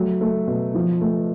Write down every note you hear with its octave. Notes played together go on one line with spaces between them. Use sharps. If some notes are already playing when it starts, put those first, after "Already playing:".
Already playing: F#3 A3
A3
B2
F3
A3